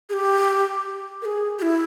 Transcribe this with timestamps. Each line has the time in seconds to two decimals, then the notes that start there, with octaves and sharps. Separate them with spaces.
0.09 G#4
0.13 G4
1.22 A#4
1.25 G#4
1.59 G4
1.62 E4